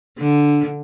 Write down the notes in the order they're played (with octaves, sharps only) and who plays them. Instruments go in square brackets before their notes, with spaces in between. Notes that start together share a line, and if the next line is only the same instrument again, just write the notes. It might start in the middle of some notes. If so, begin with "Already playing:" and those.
[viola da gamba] D3